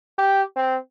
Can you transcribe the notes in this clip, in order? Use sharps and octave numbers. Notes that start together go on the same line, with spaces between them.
G4
C4